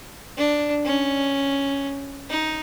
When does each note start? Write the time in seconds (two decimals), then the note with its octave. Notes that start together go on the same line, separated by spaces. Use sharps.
0.37 D4
0.85 C#4
2.30 D#4